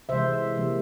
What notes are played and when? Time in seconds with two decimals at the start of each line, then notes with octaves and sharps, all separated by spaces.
0.09 C3 E3 G#3 C5 E5
0.56 C3 E3 G3 A#3